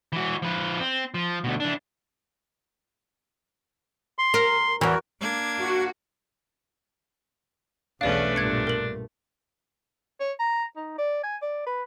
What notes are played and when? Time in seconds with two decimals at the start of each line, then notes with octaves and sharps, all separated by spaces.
0.13 E3 F#4
0.42 F3 B4
0.80 C4
1.14 F3
1.44 D2 B2
1.60 E3 D4
4.19 C6
4.34 A#4
4.81 E2 E3 F#4 A#4
5.20 A#3 D4 G#6
5.62 F#4
8.01 B1 E2 A3 C#4 D4 B4 D5 F5
8.36 G2 A#2 F#6 G#6 C#7
8.67 A#4 F#7
10.20 C#5
10.40 A#5
10.76 D#4
10.98 D5
11.23 G#5
11.42 D5
11.67 B4